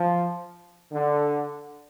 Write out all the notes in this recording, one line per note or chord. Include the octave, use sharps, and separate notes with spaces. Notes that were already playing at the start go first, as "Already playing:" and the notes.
Already playing: F3
D3